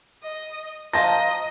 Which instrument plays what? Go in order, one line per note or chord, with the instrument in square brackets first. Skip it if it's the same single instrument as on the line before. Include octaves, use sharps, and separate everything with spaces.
[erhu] D#5
[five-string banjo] F3 C5 A5 [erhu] D#5 [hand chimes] A#5 [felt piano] A#6